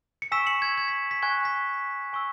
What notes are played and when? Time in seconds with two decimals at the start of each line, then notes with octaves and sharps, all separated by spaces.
0.22 C#7
0.32 G#5 C#6 E6 B6 E7
0.47 C#7 F#7
0.62 G#6
0.77 G#6
0.88 B6
1.11 B6
1.22 G#5 C#6 F#6 G#6
1.45 B6
2.13 G#5 C#6 E6